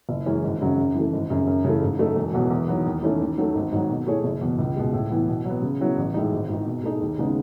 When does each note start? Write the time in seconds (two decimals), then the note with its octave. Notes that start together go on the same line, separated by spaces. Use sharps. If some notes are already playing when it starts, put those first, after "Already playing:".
0.09 F#1
0.26 F#2 E3 G#3 C#4
0.44 G#1
0.61 F#2 C#3 F#3
0.78 F#2
0.95 E3 A3
1.13 G#1
1.30 F#2 C#3
1.47 F#2
1.64 C#3 E3 A3
1.82 G#2
1.99 F#3 A3 D#4 A4
2.16 E1
2.34 E2 B2 F#3
2.50 E2
2.68 D#3 F#3 B3
2.86 D#2
3.02 D#3 A3 C#4 E4
3.21 D#2
3.38 D#3 F#3 A3
3.55 G#1
3.72 G#2 D#3 F#3
3.89 B2
4.07 A3 E4 G#4 C#5
4.24 F#1
4.41 E2 B2
4.59 C#2
4.76 B2 G#3
4.93 A2
5.10 E3 B3
5.28 B2
5.45 F#3 B3
5.62 C#3
5.80 F#3 B3 E4
5.97 A1
6.14 A2 G#3 D#4
6.32 G#1
6.49 G#2 D#3
6.66 B2
6.84 A3 D#4 G#4
7.01 D#2
7.19 C#3 G#3 B3 D#4